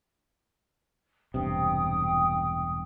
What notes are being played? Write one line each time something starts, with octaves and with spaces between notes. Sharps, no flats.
E1 G2 C3 G5 D#6